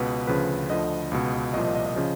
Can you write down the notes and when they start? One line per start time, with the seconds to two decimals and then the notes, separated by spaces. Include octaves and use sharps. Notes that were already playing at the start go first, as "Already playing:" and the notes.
Already playing: C#2 B2 B4
0.27 D2 C#3 F3 B4
0.69 D2 D3 F3 D#5
1.12 C#2 B2
1.53 C2 A#2 F3 D#5
1.65 D#5
1.75 D#5
1.86 D#5
1.96 C#3 F3